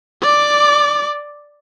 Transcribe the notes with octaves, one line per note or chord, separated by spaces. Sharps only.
D5 D6